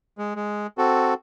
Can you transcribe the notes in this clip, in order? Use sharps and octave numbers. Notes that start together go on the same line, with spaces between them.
G#3
G#3
C4 F#4 A4